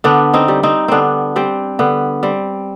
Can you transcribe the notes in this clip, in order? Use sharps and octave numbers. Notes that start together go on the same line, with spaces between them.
D3 B3 D4
C4 D#4
G3
C4 D#4
D3 B3 C4 D4
G3 C4
D3 B3
G3 C4